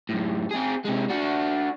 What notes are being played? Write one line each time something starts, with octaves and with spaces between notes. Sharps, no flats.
F#2 A2
C4 G#4
C3 G#3
D4 F#4